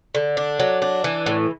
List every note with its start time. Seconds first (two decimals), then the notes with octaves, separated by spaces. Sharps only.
0.15 D3
0.37 D4
0.60 F#3
0.82 D4
1.04 E3
1.26 A2